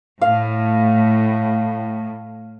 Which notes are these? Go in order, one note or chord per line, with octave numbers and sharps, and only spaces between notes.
A2 F5